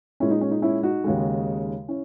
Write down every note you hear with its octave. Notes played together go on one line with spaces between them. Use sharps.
A#2 G#3 C#4 E4
D#4
C#4
D#4
C#4 E4
D#4 F#4
D#2 C#3 G#3
C#4 E4